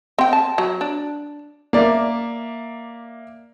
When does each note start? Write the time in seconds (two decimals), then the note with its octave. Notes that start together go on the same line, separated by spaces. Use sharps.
0.18 C4 G5
0.33 A5
0.58 F#3
0.81 D4
1.73 A#3 D5 E5